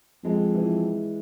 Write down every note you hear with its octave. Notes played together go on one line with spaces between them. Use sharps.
F2 G#3
E3